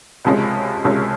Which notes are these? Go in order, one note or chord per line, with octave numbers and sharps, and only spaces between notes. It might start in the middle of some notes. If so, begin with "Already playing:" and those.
C#2 C3 F3 G#3 C#4
C#2 C3 F3 G#3 C#4